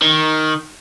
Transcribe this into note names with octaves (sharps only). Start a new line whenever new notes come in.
D#3